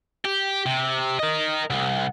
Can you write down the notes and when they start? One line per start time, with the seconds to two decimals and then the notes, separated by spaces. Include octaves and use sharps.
0.25 G4
0.66 C3
1.19 A#4 D#5
1.70 C2